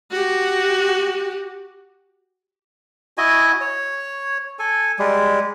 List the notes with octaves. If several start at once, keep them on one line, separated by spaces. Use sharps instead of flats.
F#4 G4
E4 F#4 D#5 G#5
C#5
A4 G#5
G3 G#3